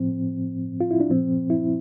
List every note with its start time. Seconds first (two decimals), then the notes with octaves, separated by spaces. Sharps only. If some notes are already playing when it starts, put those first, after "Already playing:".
Already playing: A2 F3 C4
0.81 F4
0.91 E4
1.00 D4
1.10 A#2 F3 C4
1.50 E4